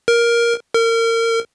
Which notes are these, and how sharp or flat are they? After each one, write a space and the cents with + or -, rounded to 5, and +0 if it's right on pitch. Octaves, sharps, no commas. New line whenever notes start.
A#4 +10
A#4 -30